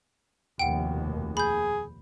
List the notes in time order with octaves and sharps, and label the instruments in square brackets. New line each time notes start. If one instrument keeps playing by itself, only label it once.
[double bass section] F1 D#2 B2 [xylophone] F#5 G5
[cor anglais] G#4 [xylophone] B5 G6